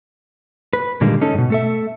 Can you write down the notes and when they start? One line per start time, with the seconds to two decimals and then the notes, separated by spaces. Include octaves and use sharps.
0.73 B4
1.01 A#2 D3 D#3 G3 G#3 A#3
1.21 C#4 D#4 A4
1.34 G2 B2
1.50 A3 A4 E5